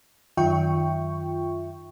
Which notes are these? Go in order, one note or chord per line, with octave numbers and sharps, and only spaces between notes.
F#2 D#3 F4 E5 G5 C#6